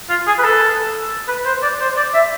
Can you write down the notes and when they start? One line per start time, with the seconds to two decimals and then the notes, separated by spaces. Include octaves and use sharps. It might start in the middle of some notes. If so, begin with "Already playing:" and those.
0.09 F4
0.27 G#4
0.39 B4
0.44 A4
1.28 B4
1.45 C5
1.62 D5
1.80 C5
1.97 D5
2.14 E5